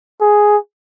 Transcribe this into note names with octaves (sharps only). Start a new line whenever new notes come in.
G#4